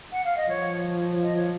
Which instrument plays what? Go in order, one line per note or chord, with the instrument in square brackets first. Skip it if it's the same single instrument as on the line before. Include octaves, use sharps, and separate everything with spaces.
[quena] F#5
F5
D#5
[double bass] F3 [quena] C#5
[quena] D#5
C#5